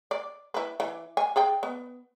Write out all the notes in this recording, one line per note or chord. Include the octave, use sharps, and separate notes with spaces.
D5
E4 B4
E3
G#5
G#4 D5 G5
B3